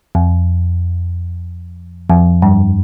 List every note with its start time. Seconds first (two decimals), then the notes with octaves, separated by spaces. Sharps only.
0.15 F2
2.10 F2
2.42 G2